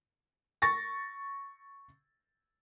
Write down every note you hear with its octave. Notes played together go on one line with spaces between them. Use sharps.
C#6 A6 A#6